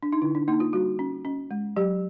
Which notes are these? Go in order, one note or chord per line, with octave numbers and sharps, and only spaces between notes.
D4
D#4
D3 E4
D4
A#3 D#4
F4
G3 F#4
C#4
C#4
G#3
F#3 G4